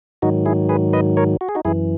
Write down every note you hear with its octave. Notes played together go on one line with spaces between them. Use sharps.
G#2 D#3 F#3 D#4 F#4
E4 G#4
G#4 B4
B4 D#5
A#4 C#5
F#4
G#4
D#4 F#4
F#2 E3 E4 G#4